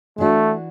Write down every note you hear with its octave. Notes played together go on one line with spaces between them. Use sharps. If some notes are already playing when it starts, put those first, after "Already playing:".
E3 A3 D4 F#4